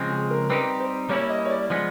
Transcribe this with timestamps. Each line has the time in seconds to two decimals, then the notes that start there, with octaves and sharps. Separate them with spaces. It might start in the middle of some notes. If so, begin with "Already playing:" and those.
Already playing: C#3 F3 G#3 C4
0.10 G#4
0.30 A#4
0.50 G3 C4 D#4 G4 B4
0.80 C5
1.09 G3 A#3 C#4 E4 C#5
1.30 D#5
1.45 C#5
1.50 D5
1.70 F3 G#3 B3